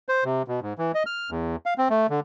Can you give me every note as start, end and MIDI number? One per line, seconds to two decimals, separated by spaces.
0.09 0.24 72
0.24 0.42 48
0.48 0.60 47
0.62 0.73 44
0.78 0.92 52
0.94 1.03 75
1.06 1.30 89
1.31 1.56 40
1.66 1.74 77
1.78 1.88 60
1.90 2.07 57
2.10 2.20 50